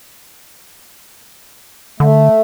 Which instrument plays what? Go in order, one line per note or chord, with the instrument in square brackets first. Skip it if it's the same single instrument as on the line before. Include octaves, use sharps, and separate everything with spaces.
[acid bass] D3 [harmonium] A3